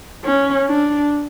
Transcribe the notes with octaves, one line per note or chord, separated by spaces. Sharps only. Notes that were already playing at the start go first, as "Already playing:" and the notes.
C#4
D4